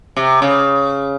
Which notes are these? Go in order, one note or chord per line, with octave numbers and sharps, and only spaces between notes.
C3
C#3